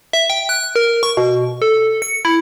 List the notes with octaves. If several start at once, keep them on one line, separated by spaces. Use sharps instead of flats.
E5
G5
F#6
A#4
C#6
B2
A4
C#7
E4